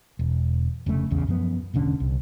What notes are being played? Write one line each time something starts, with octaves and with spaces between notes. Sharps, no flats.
E1
F1 C#3 A3
A#1 E2 C#3
F#2 F3 B3
E1 A1 D3 C#4
C2